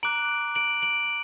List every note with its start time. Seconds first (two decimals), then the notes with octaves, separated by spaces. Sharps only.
0.03 A#5 D6 F#6 D7 F#7
0.55 D7 F#7
0.82 D7 F#7